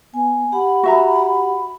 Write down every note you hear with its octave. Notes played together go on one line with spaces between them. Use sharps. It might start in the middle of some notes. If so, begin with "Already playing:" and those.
B3 G#5
G4 F#5 B5
F#4 E5 A#5